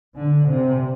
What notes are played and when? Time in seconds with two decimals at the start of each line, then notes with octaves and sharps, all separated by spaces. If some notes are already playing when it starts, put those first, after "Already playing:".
0.16 D3
0.46 C3